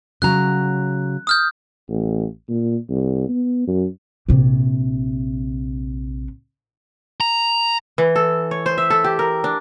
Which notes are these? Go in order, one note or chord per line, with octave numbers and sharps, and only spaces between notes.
C#3 F#3 A#5 F#6
D#6 F6 G6
A1
A#2
C2
B3
F#2
A#1 C3
A#5
E3
A4
C#5
C5
E5
A4
G4
A#4
D4